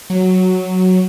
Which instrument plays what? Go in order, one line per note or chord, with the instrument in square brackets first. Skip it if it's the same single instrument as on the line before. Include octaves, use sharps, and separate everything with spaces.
[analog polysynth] F#3